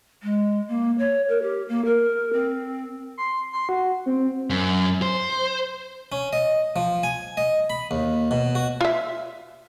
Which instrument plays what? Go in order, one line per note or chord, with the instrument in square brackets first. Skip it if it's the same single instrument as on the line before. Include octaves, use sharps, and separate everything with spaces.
[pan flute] G#3
A#3
C#5
A#4
G4
A#3
A#4
C4
[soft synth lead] C6
C6
F#4
C4
[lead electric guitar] F#2
C5
[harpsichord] C#4
D#5
F3
G#5
D#5
B5
D#2
B2
F#4
[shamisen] F4 E5